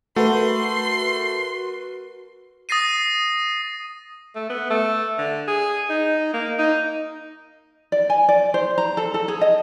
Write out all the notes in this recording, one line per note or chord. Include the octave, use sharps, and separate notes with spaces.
A3 F#4 A#4 B4 C6
D#6 A6 A#6 C7 D#7
A3
B3
A3
D3
G#4
D#4
A#3
D#4
D5
G#5
D5
C5
A#5
A4
A4
G#4
D#5